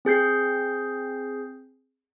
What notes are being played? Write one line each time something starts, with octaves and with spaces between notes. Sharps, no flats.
C4 G#4 G6 C7